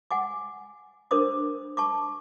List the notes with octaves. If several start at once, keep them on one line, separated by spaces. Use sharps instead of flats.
F#5 G#5 D6
D4 A#4 C5 D6 D#6
A5 C#6 D6